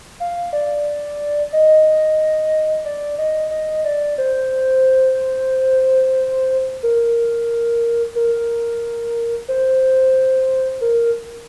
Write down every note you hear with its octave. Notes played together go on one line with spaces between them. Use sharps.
F5
D5
D#5
D5
D#5
D#5
D5
C5
A#4
A#4
C5
A#4